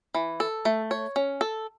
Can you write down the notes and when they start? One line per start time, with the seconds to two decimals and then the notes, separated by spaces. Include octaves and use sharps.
0.14 E3
0.40 A4
0.65 A3
0.91 C#5
1.16 C#4
1.41 A4